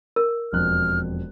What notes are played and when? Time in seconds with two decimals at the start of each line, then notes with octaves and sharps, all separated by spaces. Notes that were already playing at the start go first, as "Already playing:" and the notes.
0.16 A#4
0.52 E1 F2 F6 F#6